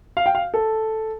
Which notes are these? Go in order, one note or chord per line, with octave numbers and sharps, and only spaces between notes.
F5
G5
F5
A4